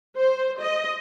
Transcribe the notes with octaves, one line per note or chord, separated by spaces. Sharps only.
C5
D#5